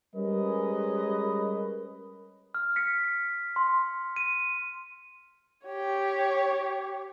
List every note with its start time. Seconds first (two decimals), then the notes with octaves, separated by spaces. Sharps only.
0.15 G3 G#3 C#4 A#4 B4 D#5
2.55 F6
2.76 B6 C#7
3.56 C6
4.16 D#7
5.65 G4 C#5